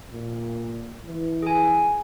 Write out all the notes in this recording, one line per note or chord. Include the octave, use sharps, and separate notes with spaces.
A#2
E3
G#4 G#5